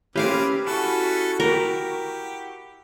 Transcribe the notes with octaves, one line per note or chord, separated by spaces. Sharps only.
A#3 C4 C#4 G4 B4 F5 D6
C#4 E4 F#4 A4
G4 A#4